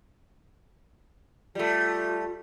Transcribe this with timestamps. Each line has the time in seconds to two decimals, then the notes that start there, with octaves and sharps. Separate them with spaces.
1.55 G3 A3 F4